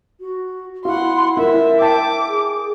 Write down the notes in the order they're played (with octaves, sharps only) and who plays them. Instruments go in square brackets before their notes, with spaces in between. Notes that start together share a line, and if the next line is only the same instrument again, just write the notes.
[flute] F#4
[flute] E4 [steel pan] F#4 F5 [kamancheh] F#5 C6
[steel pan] E4 [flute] A#4 [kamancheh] E5
[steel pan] E5 G5 A5 [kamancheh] D6
[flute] G#4